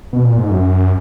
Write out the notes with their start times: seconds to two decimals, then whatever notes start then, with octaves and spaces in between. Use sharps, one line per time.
0.13 B2
0.25 A#2
0.38 G#2
0.50 F#2